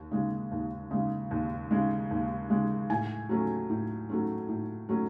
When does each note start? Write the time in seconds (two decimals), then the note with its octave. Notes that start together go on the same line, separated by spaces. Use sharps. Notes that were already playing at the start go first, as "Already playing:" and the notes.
Already playing: D#2
0.11 C#3 G#3
0.52 D#2
0.91 C#3 G#3
1.31 D#2
1.71 C#3 G#3
2.11 D#2
2.50 C#3 G#3
2.90 A2 G#5
3.29 F#3 A3 C#4
3.70 A2
4.09 F#3 A3 C#4
4.48 A2
4.89 F#3 A3 C#4